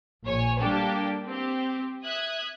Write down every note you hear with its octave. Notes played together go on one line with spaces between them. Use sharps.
A#1 C#5 G#5
G3 A#3 D4 G4 A4
C4 G4
E5 D#6 F#6 G#6